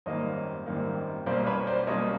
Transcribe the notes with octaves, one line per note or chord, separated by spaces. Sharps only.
G#1 F#2 D#3 G3 A#3 C#5 D#5
G#1 F#2 D#3 G3 A#3
B1 B2 G3 A#3 C#4 C5 D5
B4 C#5
C5 D5
B1 B2 G3 A#3 C#4 C#5 D#5